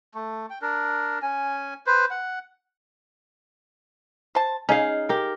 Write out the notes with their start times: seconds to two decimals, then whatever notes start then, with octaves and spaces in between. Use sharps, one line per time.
0.14 A3
0.50 G5
0.62 D4 A#4
1.22 C#4 G#5
1.86 B4 C5
2.11 F#5
4.35 C5 A5
4.69 C#4 D#4 G#4 F5
5.09 G4 A#4